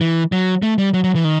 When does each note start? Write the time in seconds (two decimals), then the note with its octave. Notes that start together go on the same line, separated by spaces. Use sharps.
0.01 E3
0.32 F#3
0.62 A3
0.78 G3
0.94 F#3
1.04 F#3
1.15 E3
1.24 D#3